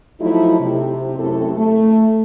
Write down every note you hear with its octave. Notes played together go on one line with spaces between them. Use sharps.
F3 F#3 A3 D#4 E4
C3
F#2 C3 A3 E4 A4
A3